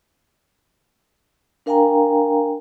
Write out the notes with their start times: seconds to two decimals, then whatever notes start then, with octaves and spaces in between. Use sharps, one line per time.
1.66 D4 A#4 F5 G5 G#5 A#5